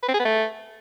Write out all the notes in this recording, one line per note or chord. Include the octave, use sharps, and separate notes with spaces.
B4
C4
G#4
B3
A3